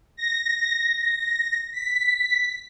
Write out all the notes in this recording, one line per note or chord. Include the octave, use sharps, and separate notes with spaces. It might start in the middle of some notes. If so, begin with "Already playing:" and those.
A#6
B6